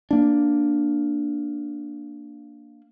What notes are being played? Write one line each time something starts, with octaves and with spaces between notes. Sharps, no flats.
A#3 D4